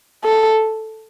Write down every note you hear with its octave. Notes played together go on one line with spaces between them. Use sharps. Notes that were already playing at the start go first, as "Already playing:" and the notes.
A4